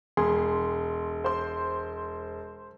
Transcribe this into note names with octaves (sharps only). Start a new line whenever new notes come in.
E1 G#4 C6
C5 C6